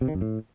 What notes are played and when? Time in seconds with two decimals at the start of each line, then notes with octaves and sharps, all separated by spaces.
0.01 C3
0.08 D#3
0.15 F#2
0.21 A2